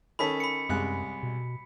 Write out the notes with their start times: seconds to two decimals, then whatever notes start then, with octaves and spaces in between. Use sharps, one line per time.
0.19 D#3 C#4 A4 B5 B6
0.40 B5 C#7
0.69 C2 F#2 G#3 F#6
1.23 B2